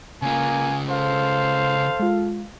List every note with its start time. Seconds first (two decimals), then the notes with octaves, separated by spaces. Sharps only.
0.22 C#3 A#3 F4 G#5
0.89 A4 C5 F5
2.00 G#3 F4